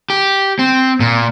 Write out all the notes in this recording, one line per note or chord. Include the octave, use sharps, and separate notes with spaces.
G4
C4
A#2